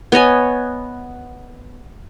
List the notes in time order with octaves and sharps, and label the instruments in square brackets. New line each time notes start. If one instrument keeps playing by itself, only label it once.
[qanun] B3 C#5 D#5 G#5